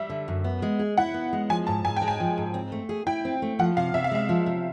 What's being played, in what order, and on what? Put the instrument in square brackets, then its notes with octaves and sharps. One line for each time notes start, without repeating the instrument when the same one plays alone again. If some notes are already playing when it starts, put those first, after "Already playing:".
Already playing: [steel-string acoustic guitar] G3 [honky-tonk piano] E5
[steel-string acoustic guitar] D3
F#2
B3
G#3
G#4
[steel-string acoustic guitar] E4 [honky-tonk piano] F#5
[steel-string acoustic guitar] B3
G#3
[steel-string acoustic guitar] F3 [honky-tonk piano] G#5
[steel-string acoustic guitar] G#2 [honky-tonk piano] A5
[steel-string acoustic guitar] G#2 [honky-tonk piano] G#5
[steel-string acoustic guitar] G#3 [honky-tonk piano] G5
[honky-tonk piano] G#5
[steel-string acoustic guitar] F3
G#2
C4
A3
G#4
[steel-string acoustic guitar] E4 [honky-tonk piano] G5
[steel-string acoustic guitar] C4
A3
[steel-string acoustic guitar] F3 [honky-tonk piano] F#5
[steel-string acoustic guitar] C3 [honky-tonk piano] F5
[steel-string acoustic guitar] C3 [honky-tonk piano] E5
[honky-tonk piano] F5
[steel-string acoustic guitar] G#3 [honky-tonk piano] E5
[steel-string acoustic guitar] F3
C3